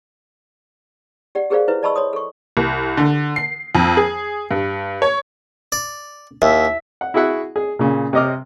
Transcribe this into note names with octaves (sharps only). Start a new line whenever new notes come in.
G4 D5 F#5
G4 G#4 A#4 C5 D5 F5
E4 B4 C5 E5
D5 D#5 A5 B5 C#6 E6
C#5 C6 D#6
A4 C#6
C2
D3
C7
F2
G#4
G2
C#5
D5
D#2 E5
F#5
E4 F#4 G#4 E5 F#5
G#4
A#2 C#3
C3 C4 D#5 D6 F6